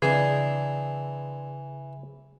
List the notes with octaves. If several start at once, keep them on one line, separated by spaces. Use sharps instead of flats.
C#3 E3 G#3 C4 D4 G#4